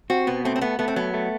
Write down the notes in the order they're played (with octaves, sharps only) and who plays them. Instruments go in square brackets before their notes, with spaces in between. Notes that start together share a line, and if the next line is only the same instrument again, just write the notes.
[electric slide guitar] C4 [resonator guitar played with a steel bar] F#4
[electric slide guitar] B2 [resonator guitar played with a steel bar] B3
[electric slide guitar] A3 [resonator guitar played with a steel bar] C4
[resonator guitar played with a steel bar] C4
[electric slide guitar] A3 [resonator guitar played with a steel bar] B3
[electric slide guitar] A3 [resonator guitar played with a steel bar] B3
[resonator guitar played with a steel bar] C4
[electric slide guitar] F#3 [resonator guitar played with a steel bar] B3
[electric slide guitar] A3